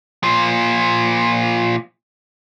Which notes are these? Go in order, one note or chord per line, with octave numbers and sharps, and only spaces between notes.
A#2 F3